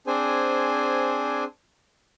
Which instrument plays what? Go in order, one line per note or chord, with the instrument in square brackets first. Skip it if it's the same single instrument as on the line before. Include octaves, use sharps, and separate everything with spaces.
[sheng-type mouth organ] C4 D4 G#4 C5 G#5